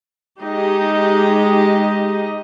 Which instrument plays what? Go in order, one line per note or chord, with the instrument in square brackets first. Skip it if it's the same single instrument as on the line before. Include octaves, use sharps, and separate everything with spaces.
[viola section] G#3 D#4 G4 D#5